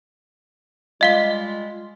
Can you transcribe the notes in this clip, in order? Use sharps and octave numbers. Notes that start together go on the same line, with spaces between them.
G3 G#3 F4 D#5 F5 G7